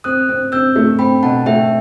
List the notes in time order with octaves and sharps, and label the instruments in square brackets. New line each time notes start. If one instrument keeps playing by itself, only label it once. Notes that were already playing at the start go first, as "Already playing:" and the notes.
[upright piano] C4 [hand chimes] D#6 F#6
[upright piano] C4
[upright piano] C4 [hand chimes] E6 G6
[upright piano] A3
[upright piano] C4 [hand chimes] G5 B5
[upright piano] B2 [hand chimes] F#5 A5
[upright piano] A3 [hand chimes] E5 G5